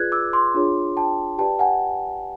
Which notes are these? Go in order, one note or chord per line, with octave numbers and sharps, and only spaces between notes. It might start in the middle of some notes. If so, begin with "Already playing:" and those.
Already playing: F4 G#4 B4 D5 F#6 G#6
D6 E6
C6 D6
D4 F4 G#4 C#5
G5 A5
G4 B4 D5 G5 A5
F#5 G#5